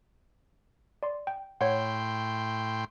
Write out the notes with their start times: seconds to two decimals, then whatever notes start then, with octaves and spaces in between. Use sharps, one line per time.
1.03 D5 C6
1.27 G5
1.61 A2 C#5 F#5 G5 C6